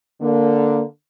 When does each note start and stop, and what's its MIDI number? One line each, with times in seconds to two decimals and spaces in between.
0.21 0.83 50
0.21 0.83 58